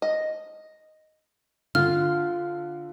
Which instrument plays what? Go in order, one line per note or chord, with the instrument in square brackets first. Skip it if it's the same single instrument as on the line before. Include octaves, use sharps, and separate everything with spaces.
[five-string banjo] D#5
[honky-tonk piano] D3 [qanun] F4 [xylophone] F6